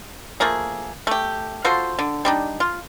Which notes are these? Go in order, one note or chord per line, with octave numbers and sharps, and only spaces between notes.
F3 A3 A#3 G#4
A3 G4
F4 F#4 A4 C5
D3
G3 D4 D#4
F4